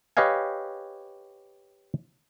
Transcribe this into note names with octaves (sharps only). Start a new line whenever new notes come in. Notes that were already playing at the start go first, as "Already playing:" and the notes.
G4 B4 C#5 D#5 F5 G#5